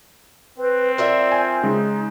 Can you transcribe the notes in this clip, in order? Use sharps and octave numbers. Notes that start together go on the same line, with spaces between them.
C4 B4
F4 A#4 D5 E5
G#5
C#3 G#3 D#4